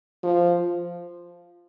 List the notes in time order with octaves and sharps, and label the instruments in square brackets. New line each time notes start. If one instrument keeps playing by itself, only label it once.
[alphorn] F3